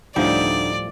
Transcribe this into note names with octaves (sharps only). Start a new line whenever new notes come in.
D2 A2 F3 G3 D#4 D5